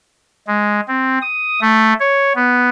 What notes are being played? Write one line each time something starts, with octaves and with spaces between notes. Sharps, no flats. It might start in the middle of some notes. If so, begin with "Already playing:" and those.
G#3
C4
D#6
A3
C#5
B3